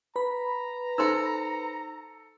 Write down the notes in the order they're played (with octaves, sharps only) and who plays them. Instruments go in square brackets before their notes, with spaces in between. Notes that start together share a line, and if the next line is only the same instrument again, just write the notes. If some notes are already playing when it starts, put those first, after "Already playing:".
[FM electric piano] B4 B5 [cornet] A#5
[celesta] D#4 C5 C6 [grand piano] A4 E6